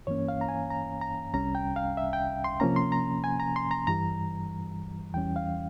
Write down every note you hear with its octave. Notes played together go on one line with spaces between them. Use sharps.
G2 E3 A#3 C#4 C#5
F5
A#5
G#5
A#5
A#5
C2 C3 G3 C#4 A#5
G5
F5
E5
G5
C6
C3 F3 A#3 C#4 A#5
C6
A#5
G#5
A#5
C6
A#5
G2 E3 G3 A#5
E2 E3 G3 C#4 G5
F5